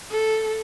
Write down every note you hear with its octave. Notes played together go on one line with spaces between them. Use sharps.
A4